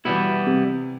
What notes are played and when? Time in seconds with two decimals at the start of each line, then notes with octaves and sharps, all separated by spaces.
0.05 B2 E3 G3 B3 E4
0.47 C3